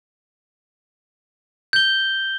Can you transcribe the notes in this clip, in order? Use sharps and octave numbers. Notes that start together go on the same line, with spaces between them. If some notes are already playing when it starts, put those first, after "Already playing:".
G6 G7